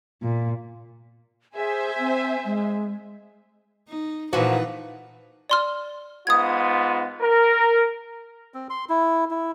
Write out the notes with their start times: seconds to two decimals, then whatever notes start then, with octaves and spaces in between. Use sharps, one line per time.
0.22 A#2
1.55 G#4 C5 E5 G#5
1.98 C4
2.45 G#3
3.89 D#4
4.33 A#2 E3 F3 D#4 F#4 B4
5.50 D5 C6 F6
6.27 G#2 B3 F4 D#6 G#6
7.20 A#4
8.54 C4
8.70 C6
8.89 E4
9.30 E4